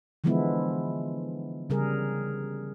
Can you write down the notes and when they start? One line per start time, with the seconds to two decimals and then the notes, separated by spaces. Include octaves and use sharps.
0.24 D3 E3 F3 G#3 B3 E4
1.70 C#3 G3 G#4 A#4